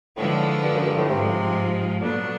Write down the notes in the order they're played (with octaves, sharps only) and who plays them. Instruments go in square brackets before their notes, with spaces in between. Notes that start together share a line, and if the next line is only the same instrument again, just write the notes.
[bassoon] A2 [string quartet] D3 F3 G#3 B3 D4
[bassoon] G2
F#2
G2
A2
[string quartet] G#2 F3 G#3 [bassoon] C3
[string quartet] A#2 F#3 B3 D4 [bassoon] D3